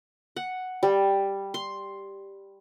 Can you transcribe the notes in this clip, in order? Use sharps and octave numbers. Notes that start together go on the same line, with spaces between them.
F#5
G3
C6